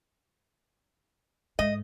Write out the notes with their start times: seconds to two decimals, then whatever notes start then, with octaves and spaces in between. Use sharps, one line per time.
1.59 G#2 D#5